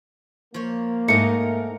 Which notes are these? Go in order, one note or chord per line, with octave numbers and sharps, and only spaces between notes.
F3 A#3 C#5
G#2 A3 D#4 A#4 E5 C#7